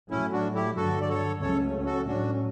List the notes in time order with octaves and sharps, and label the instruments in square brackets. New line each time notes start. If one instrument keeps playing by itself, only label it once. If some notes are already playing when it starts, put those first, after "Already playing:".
[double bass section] A2 F#3 A3 [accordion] C#4 E4
[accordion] D4 F#4
E4 G4
[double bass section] G2 D3 F#3 [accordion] F#4 A4
[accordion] D5
A4 C#5
[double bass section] C#2 C#3 F#3 A3 C#4 [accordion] A4 C#5
[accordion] F#4 A4
[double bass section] A2 F#3 C#4 [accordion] D4 F#4